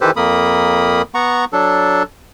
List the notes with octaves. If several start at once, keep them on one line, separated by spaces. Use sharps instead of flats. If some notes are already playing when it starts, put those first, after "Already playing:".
D#3 E3 G4 A4 B4 C5
F2 A#3 A#4 B5 D#6
B3 F#5 A#5 C#6
F#3 D4 A4